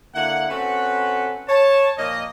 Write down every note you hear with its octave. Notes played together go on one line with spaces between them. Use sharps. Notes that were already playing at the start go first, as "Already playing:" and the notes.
D3 A#3 E4 F#5
C4 C#4 F#4 A4 B4
C#5 A5
A#2 F3 A#3 D#5